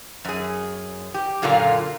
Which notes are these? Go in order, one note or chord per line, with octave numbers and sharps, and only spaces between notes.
F#2 G#4
G4
F#2 A#2 D3 A#3 F4